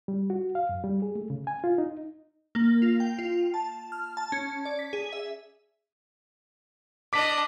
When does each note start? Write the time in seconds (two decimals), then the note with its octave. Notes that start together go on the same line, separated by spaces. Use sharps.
0.08 G3
0.30 F#4
0.55 F5
0.69 F#2
0.84 G3
1.02 G#4
1.15 A3
1.30 C#3
1.47 G#5
1.64 F4
1.78 D#4
2.55 A#3
2.82 F4
3.00 G5
3.19 F4
3.54 A5
3.92 F6
4.17 A5
4.32 C#4
4.65 D5
4.79 B6
4.93 G#4
5.13 E5
7.13 D4 D#5 D6 B6